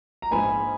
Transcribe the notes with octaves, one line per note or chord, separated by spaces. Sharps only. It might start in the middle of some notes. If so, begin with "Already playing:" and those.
A#5
A#1 G#2 F3 G#5 B5